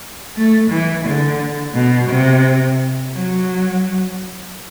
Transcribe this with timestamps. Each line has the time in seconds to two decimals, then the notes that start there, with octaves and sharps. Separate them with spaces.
0.36 A3
0.70 E3
1.05 D3
1.75 B2
2.09 C3
3.14 F#3